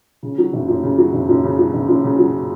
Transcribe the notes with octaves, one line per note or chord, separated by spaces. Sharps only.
C#3
F#3
F#1
F#2
C#3
F#3
F#1
F#2
C#3
F#3
F#1
F#2
C#3
F#3